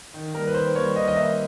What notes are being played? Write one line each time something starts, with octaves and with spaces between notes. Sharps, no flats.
D#3
G3 A#3 A#4
B4
D#3 C5
G3 A#3 C#5
D#3 D#5
D#5
G3 A#3 E5